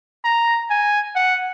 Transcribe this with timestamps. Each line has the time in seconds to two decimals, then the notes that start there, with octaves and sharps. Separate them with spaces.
0.25 A#5
0.70 G#5
1.15 F#5